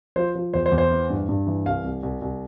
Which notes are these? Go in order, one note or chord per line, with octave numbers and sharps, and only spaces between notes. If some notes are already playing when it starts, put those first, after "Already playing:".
F3 C5
F3
E2 C5
C5
E2
C5
E3
G2
G2
E3
C2 F5
C2
C2
C2